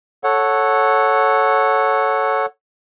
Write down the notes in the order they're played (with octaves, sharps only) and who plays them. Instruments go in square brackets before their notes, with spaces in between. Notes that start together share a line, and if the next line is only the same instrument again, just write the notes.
[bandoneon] A4 C#5 F#5